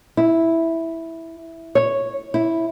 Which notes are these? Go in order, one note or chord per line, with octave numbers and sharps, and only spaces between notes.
E4
C#5
E4